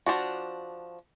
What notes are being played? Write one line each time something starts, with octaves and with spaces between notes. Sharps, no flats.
F3 D4 F#4